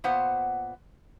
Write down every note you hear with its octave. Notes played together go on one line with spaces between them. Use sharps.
A#2 B3 C5 F#5